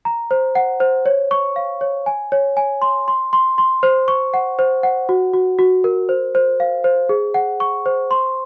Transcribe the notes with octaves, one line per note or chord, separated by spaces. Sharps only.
A#5
C5
F#5
C5
C#5
C#6
F5
C#5
G#5
C#5
G#5
C6
C6
C6
C6
C5
C#6
F#5
C5
F#5
F#4
F#4
F#4
A#4
C5
C5
F5
C5
G#4
F#5
C#6
C5
C6